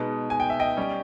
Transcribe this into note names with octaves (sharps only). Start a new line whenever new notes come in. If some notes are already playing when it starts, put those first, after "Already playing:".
Already playing: B2 G#3 B3 D#4
G#5
G5
E5
D#5 G5
G3 C#4